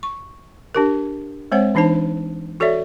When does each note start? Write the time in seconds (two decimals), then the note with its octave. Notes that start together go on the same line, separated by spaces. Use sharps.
0.03 C#6
0.75 D4 G4 A#4
1.52 G#3 C4 C5 C#5 F#5
1.75 E3 D4 D#4 C5 A5
2.60 F#4 A4 C#5 D5 E5